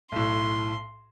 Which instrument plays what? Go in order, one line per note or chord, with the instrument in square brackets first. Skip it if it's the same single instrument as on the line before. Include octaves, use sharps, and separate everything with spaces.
[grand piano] B1 A2 [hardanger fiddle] C6